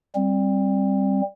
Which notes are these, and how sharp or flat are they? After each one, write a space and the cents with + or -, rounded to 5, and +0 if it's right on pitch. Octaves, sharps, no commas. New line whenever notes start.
G3 +0 C4 +20